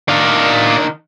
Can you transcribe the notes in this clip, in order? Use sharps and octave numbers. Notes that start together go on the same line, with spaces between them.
D#3 D4 D5 F5